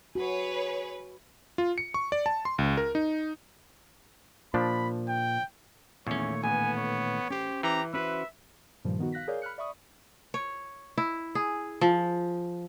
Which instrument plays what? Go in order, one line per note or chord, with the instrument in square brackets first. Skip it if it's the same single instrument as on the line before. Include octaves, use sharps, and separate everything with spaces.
[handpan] F#4 [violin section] G#4 B4 C#5
[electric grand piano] F4
C#7
C#6
D5
A5
C6
C#2
A#4
D#4
[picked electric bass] A#2 [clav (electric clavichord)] F3 D4 [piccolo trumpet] B5
[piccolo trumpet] G5
[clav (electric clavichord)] E2 C#4 [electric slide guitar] A#2 D#3 A3 [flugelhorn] C#5
[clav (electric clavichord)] A1 [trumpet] B3 [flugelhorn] G#5
[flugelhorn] C#5
[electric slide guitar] C#4 C5 [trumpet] G4
[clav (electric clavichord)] E3 [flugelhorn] G4 [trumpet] A#5
[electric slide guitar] C#4 F#4 C5 [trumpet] B4 [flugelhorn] E5
[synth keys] G2 A#2 D#3 F3 G3
D#3 B3 D#4 F#4
F5 F#6 A#6 B6
G#4 A#4 C#5 D5 F5 G6
B5 F6 F#6 C#7
D5 E5 B5 C#6 D#6
[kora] C#5
E4
G#4
F3